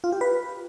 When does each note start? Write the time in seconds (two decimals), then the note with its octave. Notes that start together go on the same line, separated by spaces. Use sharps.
0.04 F4
0.12 G4
0.21 B4